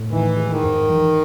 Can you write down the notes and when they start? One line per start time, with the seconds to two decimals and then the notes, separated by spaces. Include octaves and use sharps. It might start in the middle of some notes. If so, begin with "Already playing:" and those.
Already playing: A2
0.11 D#3 E3
0.37 G#3
0.50 D#3
0.63 G#2
0.88 E3